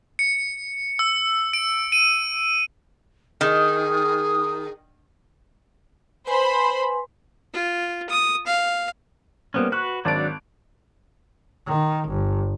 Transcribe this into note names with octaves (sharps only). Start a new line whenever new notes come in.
C#7
E6
D7
D#7
D#3 G#4 D#6
B4 C5 G#5 B5 C6
F4
D#6
F5
G3 A#3 B3 C#4 C5
F#4 B4 C#6 F#6
G#1 F#3 D4 D5 A5 D7
D#3
G1